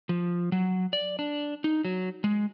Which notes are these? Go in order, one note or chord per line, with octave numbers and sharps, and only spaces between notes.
F3
F#3
D5
D4
D#4
F#3
G#3